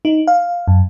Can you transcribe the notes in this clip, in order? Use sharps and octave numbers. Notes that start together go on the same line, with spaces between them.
D#4
F5
F#2